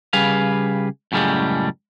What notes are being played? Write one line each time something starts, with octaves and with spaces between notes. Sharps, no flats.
C#3 G3 G#4 B4 F5
F#2 A2 C#3 G3 G#3